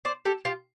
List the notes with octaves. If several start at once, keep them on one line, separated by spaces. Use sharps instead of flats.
C5 D5
G4 A4
F4 G4